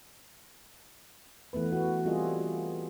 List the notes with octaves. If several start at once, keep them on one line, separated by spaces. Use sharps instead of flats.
E3 A3 B3 B4
F#4
G3 C4 F4 G#4 A4 D#5